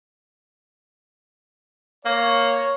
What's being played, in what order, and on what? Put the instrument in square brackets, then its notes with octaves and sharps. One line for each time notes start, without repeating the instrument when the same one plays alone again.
[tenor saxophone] A#3 [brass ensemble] C#5